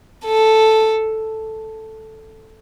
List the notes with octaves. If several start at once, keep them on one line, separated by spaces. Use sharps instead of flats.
A4